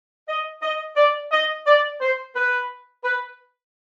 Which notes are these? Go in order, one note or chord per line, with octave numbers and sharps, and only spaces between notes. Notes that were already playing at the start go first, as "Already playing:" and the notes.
D#5
D#5
D5
D#5
D5
C5
B4
B4